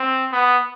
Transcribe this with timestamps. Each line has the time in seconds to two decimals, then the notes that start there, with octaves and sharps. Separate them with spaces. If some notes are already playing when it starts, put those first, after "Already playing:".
Already playing: C4
0.32 B3